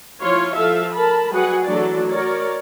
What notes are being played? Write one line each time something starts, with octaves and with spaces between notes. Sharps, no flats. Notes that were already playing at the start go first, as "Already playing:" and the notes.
F3 E4 F4 C#5 C6
F3 A4 E5 F5
A#4 A5 B5
F#3 G3 F#4 G#4 B4 F#5
E3 F#3 A3 D4 A4 D5
F#4 A#4 C#5 D5